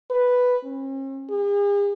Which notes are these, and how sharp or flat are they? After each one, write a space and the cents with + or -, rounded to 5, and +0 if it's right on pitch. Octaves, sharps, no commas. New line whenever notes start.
B4 +0
C#4 -45
G#4 -45